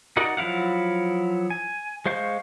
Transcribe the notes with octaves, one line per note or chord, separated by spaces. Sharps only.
D#4 F#4 A#4 D5 F#5
F3 F#3 E4 F5 F#5
G#5
G#3 C5 F5 C#6 G6